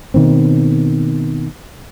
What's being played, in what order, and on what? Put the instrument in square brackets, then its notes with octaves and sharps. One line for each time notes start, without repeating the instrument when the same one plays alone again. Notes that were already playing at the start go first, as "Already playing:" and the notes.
[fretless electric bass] B2 D#3 A#3 C4